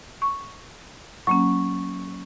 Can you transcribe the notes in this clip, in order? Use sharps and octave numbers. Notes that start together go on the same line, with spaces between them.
C#6
F#3 A#3 C#4 C#6